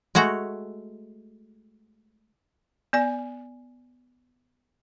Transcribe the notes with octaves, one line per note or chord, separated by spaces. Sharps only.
G#3 A3 F#4 A#5
B3 D5 G#5